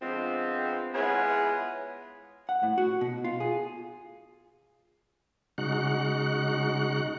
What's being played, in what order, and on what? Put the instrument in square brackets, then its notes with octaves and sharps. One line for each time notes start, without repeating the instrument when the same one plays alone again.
[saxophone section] D3 F3 G#3 B3 C4
G#3 B3 E4 F4 G#4 C#5
[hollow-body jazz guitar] F#5
A2
F#4
B2
F4
G#4
[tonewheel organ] C#3 G#3 D#4 F#4 F#5 F#6